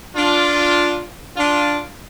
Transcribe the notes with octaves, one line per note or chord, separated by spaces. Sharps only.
D4 F4
D4 F4